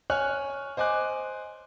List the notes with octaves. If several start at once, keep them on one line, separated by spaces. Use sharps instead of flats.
C#5 G#5 F6 F#6
C5 D#5 G#5 D6 F#6